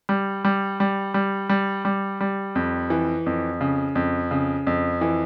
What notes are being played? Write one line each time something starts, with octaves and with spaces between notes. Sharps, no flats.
G3
G3
G3
G3
G3
G3
G3
F2
E3
F2
C#3
F2
C#3
F2
E3